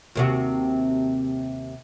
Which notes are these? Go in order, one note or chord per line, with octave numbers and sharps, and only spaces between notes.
D#2 C3 F#4